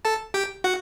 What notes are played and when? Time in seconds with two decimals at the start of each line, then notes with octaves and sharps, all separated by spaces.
0.05 A4 A5
0.34 G4 G5
0.64 F#4 F#5